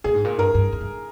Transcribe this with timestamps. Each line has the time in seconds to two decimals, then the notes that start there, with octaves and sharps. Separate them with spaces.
0.04 A#2 G#4
0.14 G#2
0.25 A#2
0.38 G2 A#4
0.54 G2
0.72 F2
0.81 G2